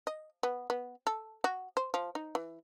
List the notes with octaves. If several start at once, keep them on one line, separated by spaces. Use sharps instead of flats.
D#5
B3
B3
A4
F#4
C5
F3
D#4
E3